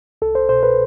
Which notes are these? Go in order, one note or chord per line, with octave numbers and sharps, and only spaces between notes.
C2 A4
C5
B2 C5
B4